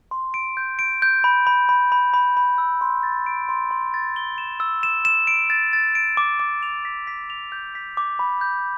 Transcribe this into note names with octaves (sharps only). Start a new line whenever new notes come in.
C6
D7
G6
D7
G6
B5
B5
B5
B5
B5
B5
E6
C6
A6
D7
C6
C6
A6
G7
E7
E6
E7
E7
D7
A6
A6
D7
D6
D6
F7
B6
B6
F7
G6
B6
D6
B5
G6